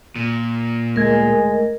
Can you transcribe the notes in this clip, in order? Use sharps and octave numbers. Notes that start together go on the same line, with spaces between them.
A#2
D2 G#3 A3 A#4 G#6